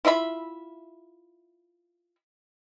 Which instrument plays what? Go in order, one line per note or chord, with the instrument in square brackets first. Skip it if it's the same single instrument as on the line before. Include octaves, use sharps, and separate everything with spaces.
[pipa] E4 F4 E5 B5